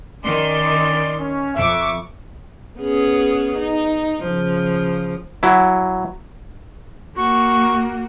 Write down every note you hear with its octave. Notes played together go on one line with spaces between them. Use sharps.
D#3 C#4 D5 C6
C#4
F2 E5 C#6 D6
B3 C#4 G#4
D#4
C#3 F3
F#3 E4
A#3 F#4 C#6